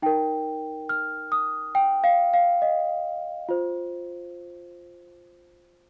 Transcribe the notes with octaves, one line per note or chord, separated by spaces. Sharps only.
D#4 A#4 G5
F6
D#6
G5
F5
F5
D#5
F4 C5